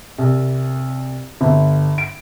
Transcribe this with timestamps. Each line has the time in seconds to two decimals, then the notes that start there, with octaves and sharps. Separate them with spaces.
0.18 C2
1.41 G1
1.98 D7